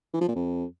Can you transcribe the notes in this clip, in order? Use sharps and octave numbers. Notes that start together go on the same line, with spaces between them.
E3
F3
A#2
F2